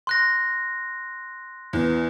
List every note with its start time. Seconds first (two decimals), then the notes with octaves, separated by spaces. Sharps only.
0.07 C6 F#6 A#6
1.73 E2